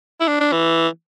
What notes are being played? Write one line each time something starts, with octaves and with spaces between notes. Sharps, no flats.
E4
D4
D4
E3